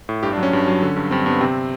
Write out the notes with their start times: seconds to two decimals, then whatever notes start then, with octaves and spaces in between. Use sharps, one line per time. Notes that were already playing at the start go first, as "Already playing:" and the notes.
0.09 A2
0.23 G2 G4
0.33 D4
0.38 F#3
0.43 C#4
0.53 G2
0.68 F#3
0.82 D3
0.96 G2
1.11 G2 C4
1.26 G2 B3
1.41 C3 C4